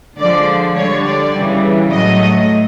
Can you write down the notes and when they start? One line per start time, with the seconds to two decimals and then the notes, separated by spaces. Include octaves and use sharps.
0.19 D3 F3 G#3 D5
0.76 D3 G3 C#5
1.04 D5
1.33 C#3 E3 G3
1.91 A2 F#3 A3 D#5